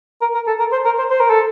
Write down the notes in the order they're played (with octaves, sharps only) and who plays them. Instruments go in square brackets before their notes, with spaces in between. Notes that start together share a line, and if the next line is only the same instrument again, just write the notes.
[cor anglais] A#4
A#4
A4
A#4
C5
A#4
C5
C5
A#4
A4